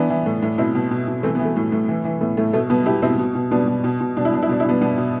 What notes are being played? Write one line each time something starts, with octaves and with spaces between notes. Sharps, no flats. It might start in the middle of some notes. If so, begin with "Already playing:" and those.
Already playing: E3 B3 D4
E3
A2
A2
B2 C4 E4
B2
B2
B2
E3 A3 C4
B3
E3
A3
A2
A2
E3
E3
A2 B3
A2 A3
B2 A3
B2 B3
B2 E4 G4
B2 C4 E4
B2
B2
B2 B3 D4
B2
B2
B2
B2 D4
E4
B2 D4
E4
B2 D4
E4
B2 B3 D4
B2 B3 D4
B2